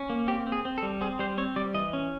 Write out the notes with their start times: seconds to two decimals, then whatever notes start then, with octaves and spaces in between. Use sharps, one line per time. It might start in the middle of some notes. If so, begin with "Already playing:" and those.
Already playing: C#4
0.10 A#3
0.28 C4 G4
0.47 C4
0.52 G#4
0.65 C4
0.78 A4
0.83 G3
1.01 C4 G#4
1.19 G3 C5
1.38 C4 C#5
1.56 G3 D5
1.74 E3 D#5
1.93 C#4